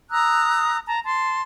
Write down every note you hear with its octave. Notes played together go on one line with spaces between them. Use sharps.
A#5 D#6 E6 F#6
A5 A#5
A5 C6